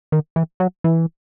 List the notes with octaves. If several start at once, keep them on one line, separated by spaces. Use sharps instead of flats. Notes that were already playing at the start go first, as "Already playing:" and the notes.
D#3
E3
F#3
E3